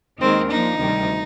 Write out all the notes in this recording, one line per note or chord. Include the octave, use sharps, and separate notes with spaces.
D#2 D#3 G#3 C4 D#4 A#4
F3 A#3 D4 D#4
D2 C3 D#3 G3